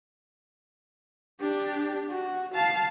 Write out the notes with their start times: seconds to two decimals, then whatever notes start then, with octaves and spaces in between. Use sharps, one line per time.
1.41 D4 G4
2.09 F#4
2.54 F5 A5